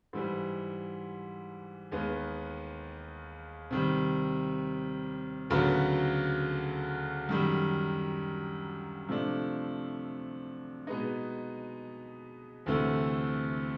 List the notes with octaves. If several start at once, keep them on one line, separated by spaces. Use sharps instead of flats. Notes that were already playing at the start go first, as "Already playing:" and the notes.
G#2 E3 G3
D#2 D#3 G#3 B3
C3 D#3 G3
D2 C#3 F#3 B3
F#2 D#3 G3
C3 F3 A3 D4
B2 G#3 B3 D#4
D2 C3 E3 A3